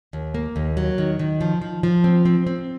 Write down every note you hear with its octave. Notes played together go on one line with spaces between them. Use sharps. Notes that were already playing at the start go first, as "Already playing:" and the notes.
D#2
A#3
D#2
F#3
D#3
D#3
F3
F3
F3
C4
C4
C4